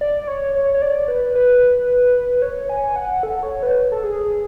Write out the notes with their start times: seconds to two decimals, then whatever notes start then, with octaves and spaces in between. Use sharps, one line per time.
0.01 D5
0.27 C#5
0.55 C#5
0.74 C#5
0.82 D5
1.08 B4
1.35 B4
2.42 C#5
2.70 G#5
2.96 F#5
3.23 A4
3.43 C#5
3.63 B4
3.92 A4
4.04 G#4